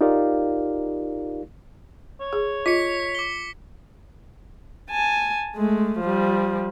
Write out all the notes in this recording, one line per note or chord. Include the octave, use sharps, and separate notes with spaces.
D#4 F4 G4 A#4 D5 F5
C#5
G#4
F4 D#5 B6 C#7
D6 G7
G#5 A5
G#3 A3
F3 G3